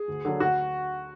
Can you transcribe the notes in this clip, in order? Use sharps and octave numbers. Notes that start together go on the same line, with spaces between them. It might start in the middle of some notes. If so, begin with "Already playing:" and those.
Already playing: G#4
D2
D3 F#3
D2 F#4